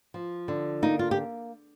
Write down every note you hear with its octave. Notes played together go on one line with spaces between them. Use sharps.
F3
D3
A#3 D#4
F4
G4